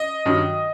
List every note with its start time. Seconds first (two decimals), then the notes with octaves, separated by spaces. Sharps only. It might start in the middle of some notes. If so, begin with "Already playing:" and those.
Already playing: D#5
0.25 G2 D#3 F#3